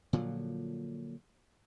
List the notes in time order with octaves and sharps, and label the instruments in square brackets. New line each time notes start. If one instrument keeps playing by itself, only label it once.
[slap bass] A#2 D3 F3 F#3